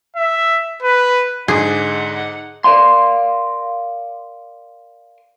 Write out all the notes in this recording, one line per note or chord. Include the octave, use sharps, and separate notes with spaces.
E5
B4
G#2 D3 D#4 G#4 F#5
A#4 B4 D5 F5 C6